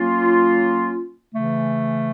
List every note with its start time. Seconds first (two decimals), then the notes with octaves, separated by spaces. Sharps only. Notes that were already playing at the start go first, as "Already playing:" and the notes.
Already playing: F#3 A#3 C#4 F4
1.31 C#3 E3 A3